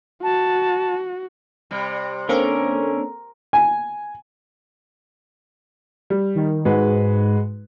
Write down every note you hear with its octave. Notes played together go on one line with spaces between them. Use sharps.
F#4 A5
C3 G3
D3 A#3 C4 C#4 A4 A#4
G#5
G3
D#3
G#2 G#3 F#4 B4